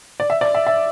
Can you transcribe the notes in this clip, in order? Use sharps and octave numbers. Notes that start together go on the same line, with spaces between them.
D5
E5
D5
E5
E5